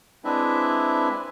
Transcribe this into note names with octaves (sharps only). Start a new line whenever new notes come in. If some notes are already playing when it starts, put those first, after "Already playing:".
G#3 C4 D4 E4 B4 E5